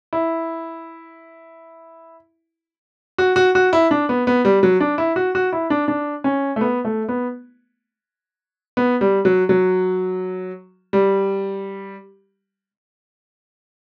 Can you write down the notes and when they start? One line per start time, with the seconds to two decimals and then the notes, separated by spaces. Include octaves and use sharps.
0.13 E4
3.18 F#4
3.36 F#4
3.55 F#4
3.73 E4
3.91 D4
4.09 B3
4.27 B3
4.45 G3
4.63 F#3
4.80 D4
4.98 E4
5.16 F#4
5.35 F#4
5.53 E4
5.70 D4
5.88 D4
6.24 C#4
6.56 A3
6.61 B3
6.85 A3
7.09 B3
8.77 B3
9.01 G3
9.25 F#3
9.49 F#3
10.93 G3